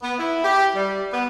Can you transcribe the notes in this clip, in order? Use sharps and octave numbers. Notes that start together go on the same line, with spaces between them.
B3
E4
G4
G3
B3